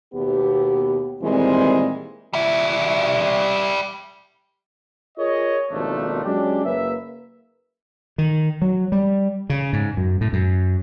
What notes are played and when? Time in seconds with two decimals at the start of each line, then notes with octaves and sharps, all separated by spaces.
0.14 D#2 B2 B3 G4
1.22 A#2 D#3 E3 G3 G#3 C4
2.33 G3 E5
5.18 F4 G#4 A#4 C#5 D#5
5.71 G#1 D#2 B2 F3 A3 D4
6.24 F#3 G#3 C#4 D4 G4
6.64 F#1 A#3 B4 E5
8.18 D#3
8.62 F#3
8.92 G3
9.50 C#3
9.73 G#2
9.97 F#2
10.21 A2
10.33 F#2